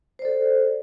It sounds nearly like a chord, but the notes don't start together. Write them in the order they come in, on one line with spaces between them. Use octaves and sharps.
C5 D5 A4